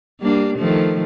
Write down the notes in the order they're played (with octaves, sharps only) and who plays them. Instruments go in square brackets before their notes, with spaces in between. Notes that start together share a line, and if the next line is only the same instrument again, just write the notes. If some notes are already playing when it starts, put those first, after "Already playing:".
[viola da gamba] G3 A#3 D4
D#3 F3 A3